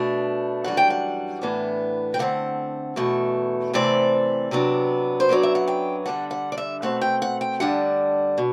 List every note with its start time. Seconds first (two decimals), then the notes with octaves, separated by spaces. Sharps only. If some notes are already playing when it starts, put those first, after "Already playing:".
Already playing: B2 A3 D4
0.64 F#2 E3 G3 D4 F#5
0.77 G5
0.90 F#5
1.42 A2 E3 B3 D4
2.14 G5
2.19 D3 A3 C4 F#5
2.96 E2 B2 A3
3.73 C3 E3 A3 C4 D5
4.51 C3 F#3 B3 D4
5.20 C5
5.29 F#2 F#3 B3 D4 D5
5.43 E5
5.55 F#5
5.68 G5
6.06 D3 G3 D4 F#5
6.31 F#5
6.52 D5
6.58 E5
6.82 B2 A3 C4 F#5
7.01 G5
7.22 F#5
7.41 G5
7.60 G2 D3 G3 D4 F#5
8.38 B2